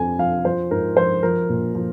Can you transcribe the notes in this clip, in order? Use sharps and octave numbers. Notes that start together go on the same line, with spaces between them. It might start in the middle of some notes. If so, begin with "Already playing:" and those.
Already playing: F2 F3 G#5
F3 F5
F3 C5
G#2 A#4
F3 C5
F3 A#4
A#2
F3